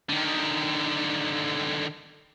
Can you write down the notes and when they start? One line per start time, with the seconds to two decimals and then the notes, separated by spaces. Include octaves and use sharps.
0.09 D3 D#3